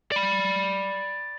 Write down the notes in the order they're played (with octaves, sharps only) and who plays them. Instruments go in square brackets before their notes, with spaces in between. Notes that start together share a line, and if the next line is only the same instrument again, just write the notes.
[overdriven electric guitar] D5 B5